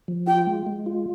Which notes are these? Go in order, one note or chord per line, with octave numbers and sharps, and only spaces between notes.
F3
F4 G5
G#3
G#3
F4